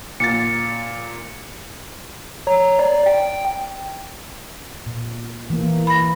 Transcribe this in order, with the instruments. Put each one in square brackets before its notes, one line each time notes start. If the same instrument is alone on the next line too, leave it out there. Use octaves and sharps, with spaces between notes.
[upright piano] A#2 A6 [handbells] C#7
[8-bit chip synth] C#5 A#5
D5
G5
[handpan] A#2
E3 A#3
[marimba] B5 A#6